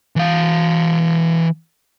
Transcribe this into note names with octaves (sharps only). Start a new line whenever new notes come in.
E3 F5